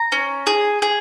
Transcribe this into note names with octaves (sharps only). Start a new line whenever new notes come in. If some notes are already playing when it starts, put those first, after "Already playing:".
Already playing: A#5
C#4
G#4
G#4